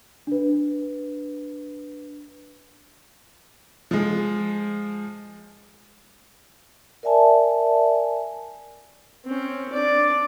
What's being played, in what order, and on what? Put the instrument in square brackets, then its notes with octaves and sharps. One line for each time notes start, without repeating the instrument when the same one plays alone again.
[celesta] D4 B4
[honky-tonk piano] F3 G#3
[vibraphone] A#4 D5 E5 G#5 A5
[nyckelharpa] C4 C#4
D4 D5